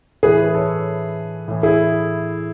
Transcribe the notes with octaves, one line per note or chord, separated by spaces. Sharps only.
A2 E3 G#4 B4
A4 C#5
A2 E3
E4 G#4